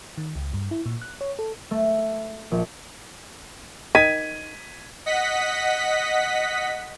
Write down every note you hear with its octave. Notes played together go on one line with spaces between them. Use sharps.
D#3
C#2
G2
E4
A#2
F#6
C#5
A4
A3
A#1
D#3 G#6 B6 D#7
D#5 F#5 B6